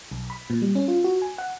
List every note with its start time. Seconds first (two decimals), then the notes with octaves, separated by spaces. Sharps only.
0.11 B1
0.30 B5
0.50 A#2
0.62 G3
0.75 C#4
0.88 F4
1.04 F#4
1.22 G#5
1.38 F#5